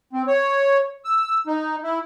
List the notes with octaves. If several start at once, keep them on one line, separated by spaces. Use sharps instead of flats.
C4
C#5
E6
D#4
E4